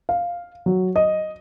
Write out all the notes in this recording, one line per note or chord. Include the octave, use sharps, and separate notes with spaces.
F5
F#3
D#5